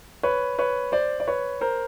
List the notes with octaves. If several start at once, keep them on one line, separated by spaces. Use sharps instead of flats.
B4 C#5
B4 C#5
C5 D5
D5
B4 C#5
A#4 C5